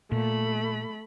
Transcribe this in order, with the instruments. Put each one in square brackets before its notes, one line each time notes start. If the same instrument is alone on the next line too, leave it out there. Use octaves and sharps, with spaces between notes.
[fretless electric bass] A#2 [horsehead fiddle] A3 B5